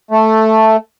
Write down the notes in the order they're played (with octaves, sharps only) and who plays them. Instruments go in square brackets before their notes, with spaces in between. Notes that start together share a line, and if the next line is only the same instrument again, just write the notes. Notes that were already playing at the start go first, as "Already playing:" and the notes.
[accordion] A3